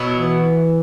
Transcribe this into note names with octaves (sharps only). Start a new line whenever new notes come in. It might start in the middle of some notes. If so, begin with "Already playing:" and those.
Already playing: B2 F#3 B3 E4
E3